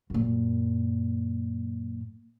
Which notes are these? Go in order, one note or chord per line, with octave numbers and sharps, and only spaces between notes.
F#2 A#2